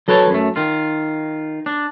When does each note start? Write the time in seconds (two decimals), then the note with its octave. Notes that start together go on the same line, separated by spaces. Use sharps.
0.08 F#3 A4 B4 C#5 G5 A5
0.30 F#2 A3
0.56 D#3 F4
1.66 D4